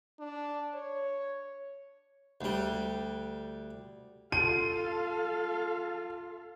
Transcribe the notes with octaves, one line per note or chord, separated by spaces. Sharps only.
D4
C#5
D2 G3
F4 A4 F5 D#7